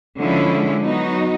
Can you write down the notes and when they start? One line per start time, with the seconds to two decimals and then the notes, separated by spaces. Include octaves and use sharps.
0.18 D3 F3 G#3 C#4 E4
0.84 F#3 B3 D#4 F#4